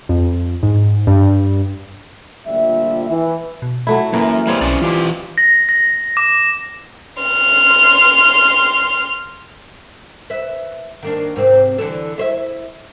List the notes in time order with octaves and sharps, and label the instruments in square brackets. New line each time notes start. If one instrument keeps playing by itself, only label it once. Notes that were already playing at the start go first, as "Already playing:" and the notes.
[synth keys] F2
G#2
G2
[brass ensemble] D2 A#2 F3 G3 E5
E3
[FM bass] B2
[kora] F#3 A3 E4
[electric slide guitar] F#2 [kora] E3 A#4 [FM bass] A#3
[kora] G3 C4 [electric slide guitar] A#3 C#5
[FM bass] B1 [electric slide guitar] C#4 D#4 D5
[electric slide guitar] E3 G4 [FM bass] F4
[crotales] A#6
A#6
D6
[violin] C6 F6
[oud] B4 E5
D#3 A#3 D4
G#2 C3 C4
D3 E3 A4
E4 C5 E5